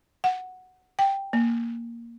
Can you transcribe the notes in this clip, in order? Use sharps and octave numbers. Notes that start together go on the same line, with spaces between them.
F#5
G5
A#3